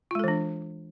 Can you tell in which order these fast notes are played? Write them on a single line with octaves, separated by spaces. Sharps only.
F4 G#3 A4 E3 D4